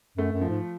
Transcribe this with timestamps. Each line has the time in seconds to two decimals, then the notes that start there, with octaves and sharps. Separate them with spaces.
0.17 F#2 A3
0.33 F#2
0.41 F3
0.49 G#2